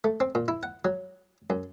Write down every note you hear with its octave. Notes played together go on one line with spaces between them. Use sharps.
A3
C4
A#2
E4
F#5
F#3
F#2